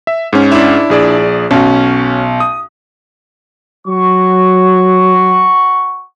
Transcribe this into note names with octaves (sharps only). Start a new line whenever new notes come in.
E5
G#2 C#4
D4 E4
A#1 G#4 D5
B1 C#4 F#4
D#6
F#3 F#4 C#6